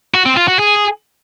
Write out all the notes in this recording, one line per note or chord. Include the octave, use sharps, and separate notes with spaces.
F#4
C4
F4
F#4
G#4